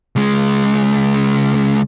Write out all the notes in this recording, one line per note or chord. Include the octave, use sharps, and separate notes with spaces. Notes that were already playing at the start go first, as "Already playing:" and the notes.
C#2 G#3